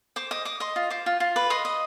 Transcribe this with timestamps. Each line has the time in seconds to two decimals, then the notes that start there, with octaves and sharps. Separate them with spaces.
0.16 C5 D6
0.31 D#5 D6
0.45 D#5 D6
0.60 D#5 C6
0.76 F4
0.90 C5 D6
1.06 F4
1.20 F4
1.36 B4 D6
1.50 D#5 C6
1.65 D#5